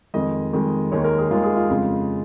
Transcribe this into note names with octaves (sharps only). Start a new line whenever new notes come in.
F2 D#3 G#3 D#5
F2 D#3 G#3
D#2 D#3 G#3 C#5
A#4
G#4
D#2 D#3 G#3 F4
G#4
F4
F2 C#3 G#3